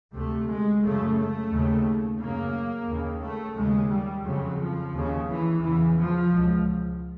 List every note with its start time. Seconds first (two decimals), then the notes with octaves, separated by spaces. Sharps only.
0.15 D2 C3 A3
0.49 G#3
0.84 F#2 C#3 A3
1.18 A3
1.52 D#2 C#3
2.20 F#2 C#3 A#3
2.89 D#2 C#3
3.23 A3
3.57 D#2 C#3 G#3
3.92 G3
4.26 F2 C#3 F#3
4.60 F3
4.94 D#2 C#3
5.28 E3
5.62 E2 C#3 E3
5.96 F3
6.31 C#2 B2